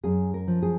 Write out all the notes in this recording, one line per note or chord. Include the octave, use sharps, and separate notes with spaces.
F#2 G#4
A#4
F3
G#4